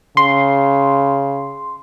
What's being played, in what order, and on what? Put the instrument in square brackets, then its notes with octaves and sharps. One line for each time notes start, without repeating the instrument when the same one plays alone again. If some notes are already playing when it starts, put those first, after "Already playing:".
[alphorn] C#3 [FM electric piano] C6